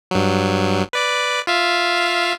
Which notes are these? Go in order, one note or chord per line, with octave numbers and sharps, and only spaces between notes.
G2 F#3
B4 D5 D6
F4 E5 F5